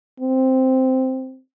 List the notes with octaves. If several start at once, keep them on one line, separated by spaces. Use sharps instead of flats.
C4